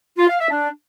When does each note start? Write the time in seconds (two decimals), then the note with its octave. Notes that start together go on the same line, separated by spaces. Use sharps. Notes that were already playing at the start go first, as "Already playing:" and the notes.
0.18 F4
0.29 F5
0.40 E5
0.51 D4